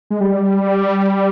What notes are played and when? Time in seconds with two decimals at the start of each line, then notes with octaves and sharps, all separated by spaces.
0.11 G#3
0.21 G3